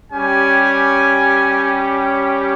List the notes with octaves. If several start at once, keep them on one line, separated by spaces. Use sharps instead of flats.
G3 C#4 G4 G#5